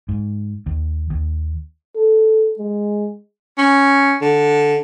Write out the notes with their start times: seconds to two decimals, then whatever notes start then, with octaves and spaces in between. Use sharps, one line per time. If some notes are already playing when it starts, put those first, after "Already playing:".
0.09 G#2
0.66 D#2
1.10 D#2
1.96 A4
2.59 G#3
3.58 C#4
4.21 D3